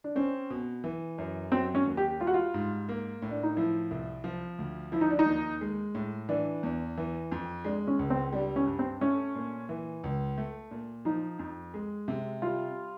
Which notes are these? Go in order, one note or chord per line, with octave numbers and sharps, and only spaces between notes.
D4
C4 C#4
B2
E3
F#2
F#3 C4
C#4
D#2
G4
G3 F4
F#4
F4
G#2
A#3
A2
D4
D#4
F3 E4
C2
F3
D2
F3 E4
D#4
D4
D#4
D#2
G#3
A2
E3 D4
E2
E3
F2
G#3 D4
C#4
C#2
C4
G3 D4
C#4
G2
C4
A3 C#4
A#2
E3
C#2
A3
A#2
F3 D#4
F2
G#3
C3
G3 F4